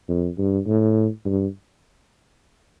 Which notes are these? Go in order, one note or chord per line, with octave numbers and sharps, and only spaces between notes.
F2
G2
A2
G2